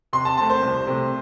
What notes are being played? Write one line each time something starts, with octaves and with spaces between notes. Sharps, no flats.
C3 C6
A5
A3 C4 A5
C5
C2
C3 A3